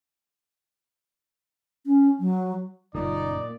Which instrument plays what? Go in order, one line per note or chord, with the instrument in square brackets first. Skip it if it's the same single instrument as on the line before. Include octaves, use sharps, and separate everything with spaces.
[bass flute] C#4
F#3
[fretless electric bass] F#1 [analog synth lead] A#2 [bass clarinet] D#4 [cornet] D5